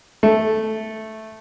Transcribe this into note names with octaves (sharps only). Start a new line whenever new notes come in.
A3